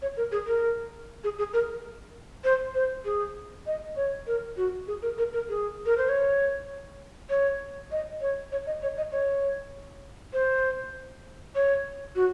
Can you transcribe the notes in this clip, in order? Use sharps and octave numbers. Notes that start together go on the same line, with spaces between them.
C#5
A#4
G#4
A#4
G#4
G#4
A#4
C5
C5
G#4
D#5
C#5
A#4
F#4
G#4
A#4
A#4
A#4
G#4
A#4
C5
C#5
C#5
D#5
C#5
C#5
D#5
C#5
D#5
C#5
C5
C#5
F#4